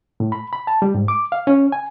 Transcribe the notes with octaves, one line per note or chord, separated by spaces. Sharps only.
A2
B5
B5
A5
G3
G#2
D6
F5
C#4
G#5